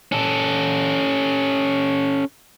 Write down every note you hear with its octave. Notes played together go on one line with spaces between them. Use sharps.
C#4 A4